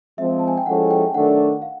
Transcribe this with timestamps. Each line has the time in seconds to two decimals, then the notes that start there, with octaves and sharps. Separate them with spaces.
0.18 F3 G#3 C4 E5
0.39 A5
0.48 G#5
0.57 G5
0.66 F3 G#3 C#4 E4 A4 F#5
0.91 G5
1.14 D#3 F#3 A3 D4 F#5
1.62 F5